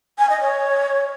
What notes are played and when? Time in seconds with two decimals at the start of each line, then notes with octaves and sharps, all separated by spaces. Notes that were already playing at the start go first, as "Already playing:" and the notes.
0.19 G#5
0.30 D#5
0.41 C#5